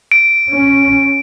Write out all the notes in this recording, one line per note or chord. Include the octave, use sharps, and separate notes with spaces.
D7
C#4